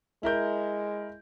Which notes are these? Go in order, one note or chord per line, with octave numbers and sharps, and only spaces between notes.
G#3 E4 A#4 G6